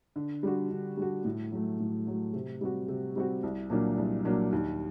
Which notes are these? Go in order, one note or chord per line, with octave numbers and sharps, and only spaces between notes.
D3
G3 D4 F#4
D3
G3 D4 F#4
A2
F#3 A3
A2
F#3 A3
C3
G3 C4 F#4
C3
G3 C4 F#4
C2
A#2 F#3 A#3 D4
C2
A#2 F#3 A#3 D4
D#2